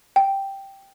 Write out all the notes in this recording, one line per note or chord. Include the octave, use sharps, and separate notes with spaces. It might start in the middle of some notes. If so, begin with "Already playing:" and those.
G5